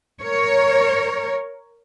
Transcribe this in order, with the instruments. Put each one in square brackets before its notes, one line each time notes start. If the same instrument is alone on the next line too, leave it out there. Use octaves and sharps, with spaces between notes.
[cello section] A#4 C#5